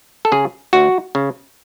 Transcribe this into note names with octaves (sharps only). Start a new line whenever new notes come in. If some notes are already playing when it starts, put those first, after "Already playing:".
A4
C#3 G#4
D2 F#4
C#3